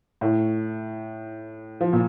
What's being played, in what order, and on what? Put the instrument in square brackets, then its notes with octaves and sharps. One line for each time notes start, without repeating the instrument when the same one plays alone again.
[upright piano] A2
F3
A#2